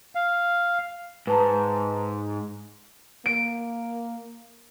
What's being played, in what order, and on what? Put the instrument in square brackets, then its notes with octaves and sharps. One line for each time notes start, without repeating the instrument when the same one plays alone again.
[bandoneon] F5
[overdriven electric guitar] G#2 [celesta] B4 A5 A#5
[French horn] A#3 [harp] D7